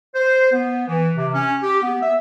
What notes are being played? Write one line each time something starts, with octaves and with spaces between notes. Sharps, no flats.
C5
B3
E3
C3
C#4
G4
B3
E5